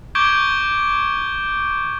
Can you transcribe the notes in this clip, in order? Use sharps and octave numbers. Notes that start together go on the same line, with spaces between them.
C#6 D6 G6 G#6 D7 G7